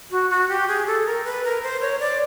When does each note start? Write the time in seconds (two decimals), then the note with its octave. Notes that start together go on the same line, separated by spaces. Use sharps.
0.11 F#4
0.30 F#4
0.49 G4
0.68 G#4
0.87 A4
1.06 A#4
1.24 B4
1.44 A#4
1.63 C5
1.81 C#5
2.00 D5